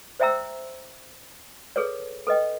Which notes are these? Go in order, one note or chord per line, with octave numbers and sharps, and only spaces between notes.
C5 D5 E5 G5 A#5 E6
G#4 A4 B4 C#5 D5
A4 B4 D#5 G5